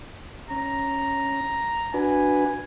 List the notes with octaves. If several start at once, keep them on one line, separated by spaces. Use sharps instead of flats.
C#4 A#5
D4 F#4 B4 G#5